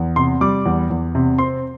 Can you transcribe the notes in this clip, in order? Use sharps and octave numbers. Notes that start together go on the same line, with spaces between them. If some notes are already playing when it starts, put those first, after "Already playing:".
Already playing: E2
C3 C6
G3 D6
E2
E2
C3
C4 C6